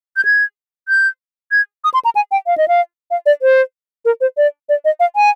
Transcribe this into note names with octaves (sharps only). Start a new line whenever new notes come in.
G6
G#6
G6
G#6
D#6
C6
A#5
G#5
G5
F5
D#5
F5
F5
D5
C5
A#4
C5
D5
D5
D#5
F5
G#5